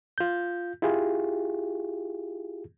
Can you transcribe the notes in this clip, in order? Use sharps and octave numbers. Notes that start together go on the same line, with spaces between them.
F4 G6
E4 F4 G4 G#4